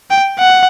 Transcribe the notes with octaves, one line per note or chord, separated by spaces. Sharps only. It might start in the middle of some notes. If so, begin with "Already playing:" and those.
G5
F#5